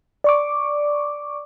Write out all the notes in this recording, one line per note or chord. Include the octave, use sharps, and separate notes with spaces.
D5 C#6 D6